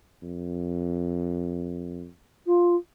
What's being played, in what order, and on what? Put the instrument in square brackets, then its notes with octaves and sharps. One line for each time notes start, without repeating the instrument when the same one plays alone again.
[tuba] F2
[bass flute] F4